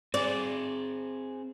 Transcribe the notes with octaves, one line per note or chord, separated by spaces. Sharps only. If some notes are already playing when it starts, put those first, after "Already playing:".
C4 G#4 D5